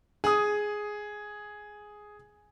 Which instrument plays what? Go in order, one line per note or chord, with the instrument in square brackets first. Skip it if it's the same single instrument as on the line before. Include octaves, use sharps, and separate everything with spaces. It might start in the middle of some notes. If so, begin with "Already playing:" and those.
[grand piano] G#4 D#6